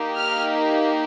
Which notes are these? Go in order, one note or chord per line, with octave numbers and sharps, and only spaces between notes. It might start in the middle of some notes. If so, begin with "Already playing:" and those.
Already playing: A#3 D#4 G4
F6